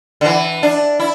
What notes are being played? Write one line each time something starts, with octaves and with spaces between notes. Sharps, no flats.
D3
E3
D4
E4